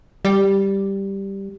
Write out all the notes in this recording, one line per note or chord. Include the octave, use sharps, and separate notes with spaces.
G3